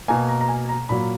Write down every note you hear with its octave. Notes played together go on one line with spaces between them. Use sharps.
B2 A#3 G#5
A#5
A#5
G#5
A#5
A#2 F#3 A#3 B5